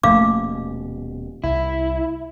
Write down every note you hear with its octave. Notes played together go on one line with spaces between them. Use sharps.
D#1 B2 F3 A3 A#3 C#4 F5 D6
C2 E4